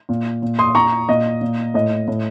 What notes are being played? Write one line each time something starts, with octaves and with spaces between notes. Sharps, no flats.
A#2
A#2
C6 D#6
A#2 A#5 C#6
A#2 D#5
A#2
A2 D#5
A2